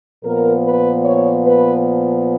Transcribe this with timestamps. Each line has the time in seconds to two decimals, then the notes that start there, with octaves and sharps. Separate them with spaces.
0.24 A#2 F3 B3 A#4
0.65 B4
1.05 C#5
1.46 B4